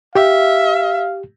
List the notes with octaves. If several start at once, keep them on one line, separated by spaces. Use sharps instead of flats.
G4 E5 F5